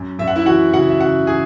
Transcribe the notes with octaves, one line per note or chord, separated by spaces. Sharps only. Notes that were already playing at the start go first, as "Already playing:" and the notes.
Already playing: F#2
F#2 E5
F#5
E4 E5
E3 F#4 F#5
C#3 F#4 F#5
E5
C#3 F#4 F#5
E3 G#4 G#5